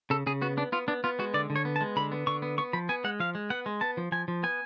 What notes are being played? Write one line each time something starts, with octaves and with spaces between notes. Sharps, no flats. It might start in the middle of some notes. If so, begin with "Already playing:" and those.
C#3 A4
C#3 G#4
B3 F#4
B3 D4
B3 F4
B3 D4
B3 F4
G#3 F#4
D3 D5
D3
C#5
B3
A5
G#3
D3 B5
B3
D3 C#6
B3
B3 C#6
F3 B5
B3 G#5
G#3 F#5
F3 F5
G#3
B3 F#5
G#3
B3 A5
F3
F3 G#5
F3
B3 G#5